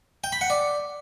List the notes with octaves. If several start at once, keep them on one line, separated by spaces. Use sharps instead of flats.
G5
B5
F#5
D5